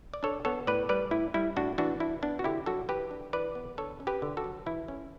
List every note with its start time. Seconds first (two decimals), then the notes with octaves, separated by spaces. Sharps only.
0.14 D5
0.23 D4 A4 C#5
0.45 B3 A4 C#5
0.67 A2 B4 D5
0.89 G3 B4 D5
1.11 A2 E4
1.34 G3 E4
1.56 A2 D4 F#4
1.78 E3 D4 F#4
2.00 D4 E4
2.22 B3 D4
2.39 F#4
2.44 D3 E4 G4
2.66 F#3 F#4 A4
2.89 E3 G4 B4
3.11 D4
3.33 E3 B4 D5
3.55 B3
3.77 D3 A4 C#5
4.00 C#4
4.07 G4 B4
4.22 D3
4.37 F#4 A4
4.44 F#3
4.66 E3 E4
4.88 C#4